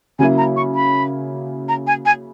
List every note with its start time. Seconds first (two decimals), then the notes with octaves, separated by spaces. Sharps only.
0.19 C#3 F#3 A#3 E4 G#5
0.38 A#5
0.56 C#6
0.75 B5
1.69 A#5
1.87 G#5
2.06 G#5